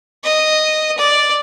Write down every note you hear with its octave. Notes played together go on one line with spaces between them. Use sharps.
D#5
D5